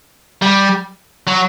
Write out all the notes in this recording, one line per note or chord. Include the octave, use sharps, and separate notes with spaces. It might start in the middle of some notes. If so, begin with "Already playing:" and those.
G3
F#3